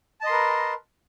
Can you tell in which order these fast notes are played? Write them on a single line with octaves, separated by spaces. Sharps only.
A5 D#5 C6 A#4 B4